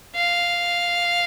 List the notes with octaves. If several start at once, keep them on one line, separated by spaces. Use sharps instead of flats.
F5